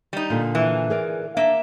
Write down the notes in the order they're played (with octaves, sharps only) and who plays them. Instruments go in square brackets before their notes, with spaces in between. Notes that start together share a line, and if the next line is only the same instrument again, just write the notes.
[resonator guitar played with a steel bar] G3 D#4
[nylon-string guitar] A#2 D3
[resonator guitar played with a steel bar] E3
[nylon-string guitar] G#4 A#4 D5
[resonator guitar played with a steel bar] A#3 E5 [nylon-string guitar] D4